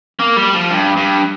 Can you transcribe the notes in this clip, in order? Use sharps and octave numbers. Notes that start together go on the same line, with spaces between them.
A#3
G3
F3
G2
G2